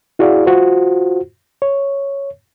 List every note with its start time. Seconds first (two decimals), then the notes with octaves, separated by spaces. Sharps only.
0.19 E4 F#4 G#4 D5 F5
0.46 F4 F#4 C5
1.62 C#5